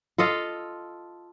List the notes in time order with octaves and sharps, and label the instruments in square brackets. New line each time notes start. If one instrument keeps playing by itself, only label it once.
[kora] F4 A4 D#5 F5